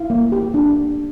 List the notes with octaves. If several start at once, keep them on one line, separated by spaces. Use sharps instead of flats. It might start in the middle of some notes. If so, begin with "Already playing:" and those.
Already playing: E4 F5
A#3
G4
D4